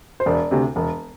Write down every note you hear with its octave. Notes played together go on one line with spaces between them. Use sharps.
C5
E1 D5
D2 C3
E1